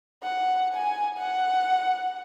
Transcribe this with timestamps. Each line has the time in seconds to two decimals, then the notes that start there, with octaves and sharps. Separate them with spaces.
0.23 F#5
0.74 G#5
1.18 F#5